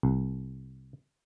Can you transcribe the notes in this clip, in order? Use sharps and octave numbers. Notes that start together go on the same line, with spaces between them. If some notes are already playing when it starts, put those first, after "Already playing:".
C2